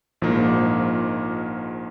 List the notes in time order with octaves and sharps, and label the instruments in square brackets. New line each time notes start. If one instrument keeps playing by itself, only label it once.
[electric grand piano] A#1 G#2 F3 A#3 D#4